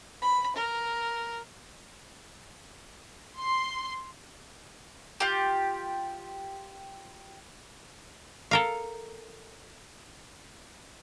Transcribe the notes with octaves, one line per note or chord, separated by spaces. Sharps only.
B5
A#4
C6
F4 G4
A4 A#4 F5